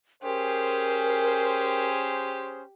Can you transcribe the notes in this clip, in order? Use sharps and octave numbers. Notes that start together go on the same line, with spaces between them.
C#4 G4 G#4 A#4 C5